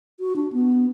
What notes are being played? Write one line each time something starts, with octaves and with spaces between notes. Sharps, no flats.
F#4
D4
B3